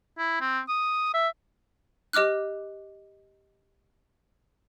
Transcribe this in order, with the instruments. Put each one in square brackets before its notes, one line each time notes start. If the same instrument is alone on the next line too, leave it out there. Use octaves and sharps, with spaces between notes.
[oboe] E4
C4
D#6
E5
[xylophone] G4 D#5 D6 F6 F#6